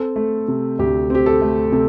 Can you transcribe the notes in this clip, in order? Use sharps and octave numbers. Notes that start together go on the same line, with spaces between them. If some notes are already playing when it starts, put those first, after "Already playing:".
Already playing: C4 A4
A3
C3
D2 G4
C4 G4
A4
A3
C3 A4